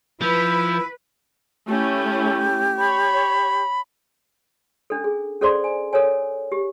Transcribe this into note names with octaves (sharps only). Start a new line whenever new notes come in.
F3 E4 B4
A3 C#4 E4 G4
C#5 B5
C#4 D4 A4
G#4
C#4 G#4 A4 C5 D5 C6
G#5
A4 A#4 C#5 G#5
G4